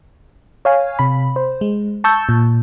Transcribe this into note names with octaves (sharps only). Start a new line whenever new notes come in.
C#5 F5 G#5
C3 B5
C5
G#3
A5 C#6 E6 G6
A#2